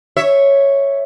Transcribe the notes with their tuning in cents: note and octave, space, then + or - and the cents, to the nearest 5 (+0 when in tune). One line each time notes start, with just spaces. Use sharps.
C#5 +0 E5 +0